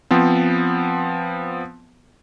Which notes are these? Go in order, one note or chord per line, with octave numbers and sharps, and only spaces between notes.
F3 B3 C4